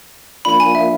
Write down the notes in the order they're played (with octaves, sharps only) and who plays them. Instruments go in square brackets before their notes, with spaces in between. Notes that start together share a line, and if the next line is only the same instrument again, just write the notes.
[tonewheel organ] F3 A#3 D4 F4 [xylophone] B5
[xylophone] G#5
E5